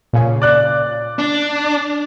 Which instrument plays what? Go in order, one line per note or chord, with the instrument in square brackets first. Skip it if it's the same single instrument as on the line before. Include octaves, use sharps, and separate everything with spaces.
[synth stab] A#2 C#3
[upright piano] D5 F#6
[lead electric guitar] D4